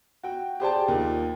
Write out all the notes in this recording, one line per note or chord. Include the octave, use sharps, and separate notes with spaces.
F#4 G5
G4 G#4 C5 D5 G5 A5
D#2 F3